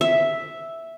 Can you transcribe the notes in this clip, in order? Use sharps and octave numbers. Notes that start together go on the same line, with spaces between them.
E5